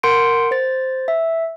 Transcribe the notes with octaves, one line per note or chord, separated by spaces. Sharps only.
A#4 F#5 C6 G6 C#7 D7
C5 A6
E5